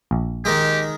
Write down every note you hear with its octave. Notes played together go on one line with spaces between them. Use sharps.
A#1
D#3 G#3 G4